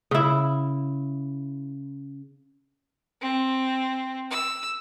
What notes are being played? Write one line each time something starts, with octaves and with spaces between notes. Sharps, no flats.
C#3 E4
C4
E6